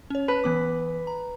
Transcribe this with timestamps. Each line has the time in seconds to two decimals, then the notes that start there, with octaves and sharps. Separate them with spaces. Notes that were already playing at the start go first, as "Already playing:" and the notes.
0.10 C#4 C#5
0.28 B4 A5 F#6
0.44 E3 B3 D6
1.07 A#5